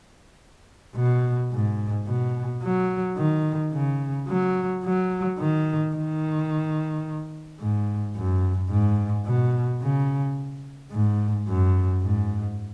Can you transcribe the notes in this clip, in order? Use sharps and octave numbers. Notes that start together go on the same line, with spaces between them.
B2
G#2
B2
F#3
D#3
C#3
F#3
F#3
D#3
D#3
G#2
F#2
G#2
B2
C#3
G#2
F#2
G#2